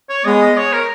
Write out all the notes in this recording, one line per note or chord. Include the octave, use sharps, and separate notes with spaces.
C#5
G#3 B3 D#5
D#5
C#5
A#4